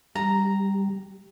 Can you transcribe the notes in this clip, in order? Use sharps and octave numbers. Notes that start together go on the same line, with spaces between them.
G3 A#5